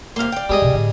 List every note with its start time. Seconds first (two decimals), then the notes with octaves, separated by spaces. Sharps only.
0.16 C3 A#3 F5 C6
0.32 D5 G5
0.49 G3 G#3 G#4 D#5
0.62 D2 B2
0.74 A2 D3